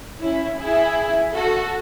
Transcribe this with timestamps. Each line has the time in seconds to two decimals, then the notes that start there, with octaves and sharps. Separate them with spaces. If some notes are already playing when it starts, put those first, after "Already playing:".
0.21 C#4 E4
0.59 E4 G#4
1.34 F#4 A4